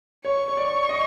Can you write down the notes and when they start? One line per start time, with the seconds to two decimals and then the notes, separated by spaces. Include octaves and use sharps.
0.25 C#5 C#6
0.48 C#5
0.57 D5
0.89 D#5